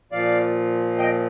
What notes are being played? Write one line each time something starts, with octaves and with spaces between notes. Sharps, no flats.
A#2 F3 D5 F5
D#5 G5